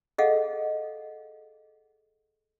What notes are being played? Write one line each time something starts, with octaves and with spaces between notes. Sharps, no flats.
G#4 A4 D#5 F5 F#5